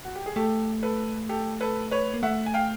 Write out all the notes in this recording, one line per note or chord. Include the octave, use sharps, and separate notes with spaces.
F#4
G4
G#4
A3 G4 A4
A4 B4
G4 A4
A4 B4
B4 C#5
A#3
A3 E5 F#5
G#5
F5 G5